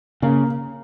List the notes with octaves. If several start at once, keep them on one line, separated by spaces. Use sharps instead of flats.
C#3 A#3